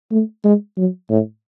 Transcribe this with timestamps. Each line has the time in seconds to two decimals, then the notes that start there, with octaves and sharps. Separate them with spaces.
0.11 A3
0.44 G#3
0.77 F#3
1.10 A2